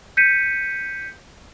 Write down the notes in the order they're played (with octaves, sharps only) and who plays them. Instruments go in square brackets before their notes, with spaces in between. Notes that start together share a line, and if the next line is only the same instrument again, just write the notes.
[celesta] G6 B6 C#7 D#7